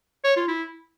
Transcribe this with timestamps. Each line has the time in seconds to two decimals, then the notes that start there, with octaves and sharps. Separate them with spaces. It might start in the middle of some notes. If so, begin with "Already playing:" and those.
0.24 C#5
0.36 F4
0.48 E4